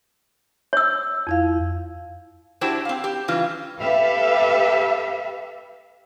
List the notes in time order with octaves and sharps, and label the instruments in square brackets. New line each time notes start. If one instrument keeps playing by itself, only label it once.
[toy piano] C#5 E6
[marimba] F2 E4 F5
[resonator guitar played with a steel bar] D4 E4 F#4 G4 C5 D5
C4 F5
G4
C#3 E3 G3 F4
[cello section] G4 A4 B4 E5 F5